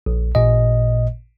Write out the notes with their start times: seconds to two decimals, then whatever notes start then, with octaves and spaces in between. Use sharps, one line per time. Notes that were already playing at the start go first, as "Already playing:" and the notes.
0.06 A#1
0.35 A1 A#2 D#5